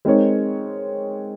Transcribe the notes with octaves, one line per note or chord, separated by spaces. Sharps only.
G#3 C4 D#4 A#4 C#5